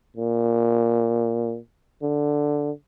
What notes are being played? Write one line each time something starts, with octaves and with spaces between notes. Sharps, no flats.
A#2
D3